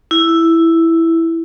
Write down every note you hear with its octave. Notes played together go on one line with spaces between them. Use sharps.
E4